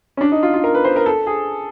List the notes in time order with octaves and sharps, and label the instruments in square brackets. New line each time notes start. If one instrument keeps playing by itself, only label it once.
[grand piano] C#4
D4
D#4
F4
F4
A#4
B4
C5
A#4
A4
G#4